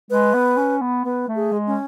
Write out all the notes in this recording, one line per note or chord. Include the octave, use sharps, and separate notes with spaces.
G#3 B4
B3
C#4
B3
B3 B4
A3
G#4
G#3
C#4